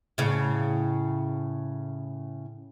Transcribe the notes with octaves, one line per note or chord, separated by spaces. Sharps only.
A2 C#3